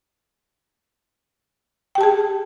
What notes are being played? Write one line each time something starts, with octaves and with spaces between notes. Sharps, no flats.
G4 G#4 G5 A5